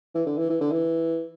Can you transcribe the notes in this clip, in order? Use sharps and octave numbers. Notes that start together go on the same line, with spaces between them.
E3
D3
E3
E3
D3
E3